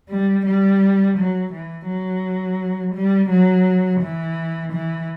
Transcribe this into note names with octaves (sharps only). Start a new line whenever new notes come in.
G3
G3
F#3
E3
F#3
G3
F#3
E3
E3